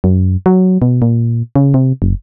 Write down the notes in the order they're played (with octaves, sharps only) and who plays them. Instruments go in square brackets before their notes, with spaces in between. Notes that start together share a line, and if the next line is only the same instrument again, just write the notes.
[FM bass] F#2
F#3
B2
A#2
C#3
C3
F#1